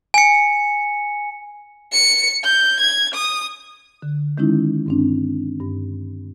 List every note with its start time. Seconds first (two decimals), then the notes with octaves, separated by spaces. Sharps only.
0.14 G#5 C#7
1.92 C#7
2.44 G6
2.80 G#6
3.15 D#6
4.02 D3
4.38 D#3 G#3 C#4 D#4 E4
4.86 G2 C4 D4
5.60 G2